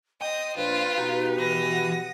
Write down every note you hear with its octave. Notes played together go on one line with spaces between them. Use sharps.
C5 D#5 G5 D#6
A#2 F3 D4 F4 B4
B2 D#4 F#4 G4
E3 D#6 A#6
F#5